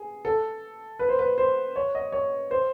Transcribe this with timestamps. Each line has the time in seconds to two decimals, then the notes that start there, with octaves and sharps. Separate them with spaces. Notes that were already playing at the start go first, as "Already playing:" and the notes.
Already playing: G#4
0.25 A4
0.99 B4
1.09 C5
1.19 B4
1.38 C5
1.76 C#5
1.95 D#5
2.12 C#5
2.51 C5